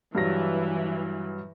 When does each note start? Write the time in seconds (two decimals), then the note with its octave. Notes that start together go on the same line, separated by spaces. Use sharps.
0.15 G2 E3 F#3 A#6